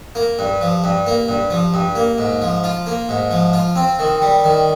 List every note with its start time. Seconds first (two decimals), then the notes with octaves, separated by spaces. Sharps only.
0.15 A#3
0.39 G2
0.61 F3
0.84 G2
1.06 A#3
1.29 G2
1.50 F3
1.74 G2
1.95 A#3
2.18 G#2
2.42 F3
2.64 F4
2.87 A#3
3.09 G#2
3.31 F3
3.53 F4
3.76 C4
3.99 D#3
4.22 G3
4.44 D#3